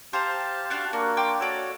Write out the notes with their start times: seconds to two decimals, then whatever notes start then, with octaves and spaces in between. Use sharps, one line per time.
0.13 G4 C5 F5 A5 A#5
0.70 D4 F4 F#4
0.93 A#3 D4 F#4 A#4
1.17 G5 C6 D6
1.40 F#4 A4 C#5 D5